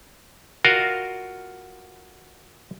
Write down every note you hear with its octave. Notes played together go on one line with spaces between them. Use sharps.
F4 F#4 A#4 D#5 F5